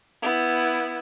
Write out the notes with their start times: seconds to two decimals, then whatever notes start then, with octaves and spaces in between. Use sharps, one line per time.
0.22 B3 E4